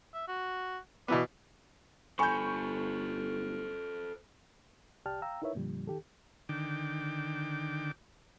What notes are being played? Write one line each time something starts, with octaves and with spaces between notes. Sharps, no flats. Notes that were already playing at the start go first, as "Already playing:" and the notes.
E5
F#4
B2 E3 B3 D5
G1 A4 C5 G#5 B5 C#6 G6
C2 G4 D5 G5 A5 F6
F5 G5 A#5 E6
D#4 E4 A#4 B4 C#5 E5
F2 A#2 D3 F3 G3
D#3 G4 A4
D3 D#3 G5 D6